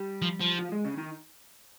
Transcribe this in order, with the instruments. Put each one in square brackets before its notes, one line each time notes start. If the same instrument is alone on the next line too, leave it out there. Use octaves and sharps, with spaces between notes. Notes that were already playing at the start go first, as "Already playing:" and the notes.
Already playing: [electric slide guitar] G3 G4
[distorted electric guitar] F3
F3
[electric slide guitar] F3 F4
G#3 G#4
C#3 C#4
D#3 D#4